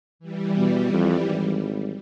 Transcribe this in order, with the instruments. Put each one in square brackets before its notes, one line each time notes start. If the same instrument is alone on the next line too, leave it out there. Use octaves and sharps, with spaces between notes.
[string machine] E3 G3
[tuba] B2
F2
G#1